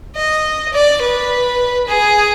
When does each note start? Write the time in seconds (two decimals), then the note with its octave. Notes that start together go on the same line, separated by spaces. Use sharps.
0.16 D#5
0.74 D5
1.02 B4
1.88 G#4